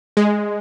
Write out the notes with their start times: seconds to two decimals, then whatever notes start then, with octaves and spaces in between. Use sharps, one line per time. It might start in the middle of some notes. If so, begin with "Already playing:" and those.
0.17 G#3